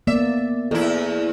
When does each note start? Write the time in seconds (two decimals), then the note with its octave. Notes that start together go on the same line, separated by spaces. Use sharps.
0.07 A#3 B3 D5 E5
0.71 E2 E4 A4